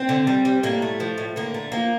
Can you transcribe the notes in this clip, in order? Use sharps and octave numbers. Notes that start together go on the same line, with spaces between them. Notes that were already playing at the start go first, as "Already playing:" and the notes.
Already playing: C4
D3
G3
G3
A2 A#3
A3
F3
A2
D3 A#3
A3
F3 A#3